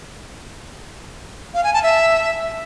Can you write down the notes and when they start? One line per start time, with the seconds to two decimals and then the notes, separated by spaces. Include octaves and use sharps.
1.54 F5
1.64 G#5
1.74 A5
1.83 E5